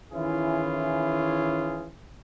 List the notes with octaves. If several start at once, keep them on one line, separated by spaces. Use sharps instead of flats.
D#3 E3 C#4 E4 F4 G#4